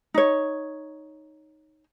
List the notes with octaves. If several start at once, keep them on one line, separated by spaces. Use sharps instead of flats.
D#4 C#5